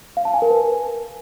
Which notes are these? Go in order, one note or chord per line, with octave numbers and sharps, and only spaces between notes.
F5
A5
G#5
A#4
B4